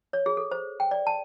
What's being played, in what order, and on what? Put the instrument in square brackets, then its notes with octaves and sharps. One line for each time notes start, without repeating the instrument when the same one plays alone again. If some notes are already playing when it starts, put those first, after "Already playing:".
[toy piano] C#5
G#4
A4
C5
G5
D5
A5